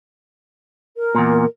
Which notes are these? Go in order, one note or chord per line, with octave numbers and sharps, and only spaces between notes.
A#4
E2 A#2